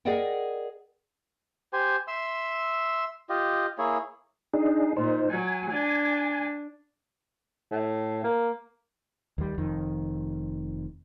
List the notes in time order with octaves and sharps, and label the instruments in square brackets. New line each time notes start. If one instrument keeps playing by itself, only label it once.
[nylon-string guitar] G#4 A#4 D5 D#5 F#5 G5
[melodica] G4 C5 G#5
E5 C6 E6
F4 G4 D#5
A#3 E4 G#4 C#5
[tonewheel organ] D4 D#4 G#4
[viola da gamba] A#2 [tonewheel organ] D#4 C5
[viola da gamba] F#3 [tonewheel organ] G#5
[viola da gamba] D4
[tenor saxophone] A2
A#3
[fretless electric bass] D#2 G3
F1 F2 D#3